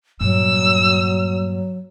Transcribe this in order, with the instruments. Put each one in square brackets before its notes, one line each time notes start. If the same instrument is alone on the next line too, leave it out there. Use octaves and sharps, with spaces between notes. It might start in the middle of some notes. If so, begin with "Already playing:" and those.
[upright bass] G2 A#2 [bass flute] F#3 [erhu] E6